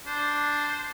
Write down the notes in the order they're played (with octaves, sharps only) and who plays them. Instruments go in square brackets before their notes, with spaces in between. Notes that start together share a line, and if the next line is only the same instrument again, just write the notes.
[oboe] D4 [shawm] C5